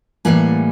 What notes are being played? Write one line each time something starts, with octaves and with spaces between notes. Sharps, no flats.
A2 E3 G3 A#3 F#5 G#5